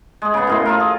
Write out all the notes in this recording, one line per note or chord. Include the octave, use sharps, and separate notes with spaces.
G#3 G#4
C#3 B3
F#2 A2 C6
F4 A4 A#4
G#4